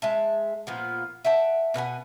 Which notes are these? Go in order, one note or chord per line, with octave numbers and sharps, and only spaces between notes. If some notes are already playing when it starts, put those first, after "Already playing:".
G#3 E5 A5
A#2 F3 B3
E5 F#5 G5 A5
B2 B4 F#5 G#5